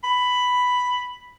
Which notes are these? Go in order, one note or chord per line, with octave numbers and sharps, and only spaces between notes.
B5